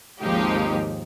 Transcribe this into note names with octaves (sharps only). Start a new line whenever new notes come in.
G#1 D#2 F3 G#3 D#4 G4